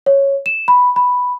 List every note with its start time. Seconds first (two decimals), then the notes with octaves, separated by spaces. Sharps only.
0.06 C#5
0.46 E7
0.68 B5
0.96 B5